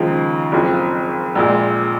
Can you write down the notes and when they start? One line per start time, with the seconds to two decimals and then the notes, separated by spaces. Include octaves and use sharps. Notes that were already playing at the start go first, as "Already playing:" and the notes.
Already playing: D#2 C#3 F3 G#3 D#4
0.52 F#1 F2 F3
1.35 A#1 A#2 G#3